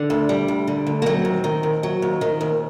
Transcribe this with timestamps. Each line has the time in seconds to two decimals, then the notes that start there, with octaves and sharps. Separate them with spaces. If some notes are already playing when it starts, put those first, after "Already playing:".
Already playing: D3 D4
0.10 D2
0.29 G3
0.48 D2
0.67 D3
0.87 D2
1.02 A#3
1.06 F#3 C4
1.25 D#2
1.44 D#3
1.63 D#2
1.83 F#3
2.02 D#2
2.21 D#3
2.41 D#2